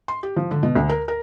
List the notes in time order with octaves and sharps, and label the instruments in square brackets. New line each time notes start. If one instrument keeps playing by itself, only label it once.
[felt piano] C6
G4
F3
D3
B2
D2
A#4
A#4